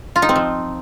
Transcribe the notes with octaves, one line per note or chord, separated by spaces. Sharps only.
F4
D#4
C4
F3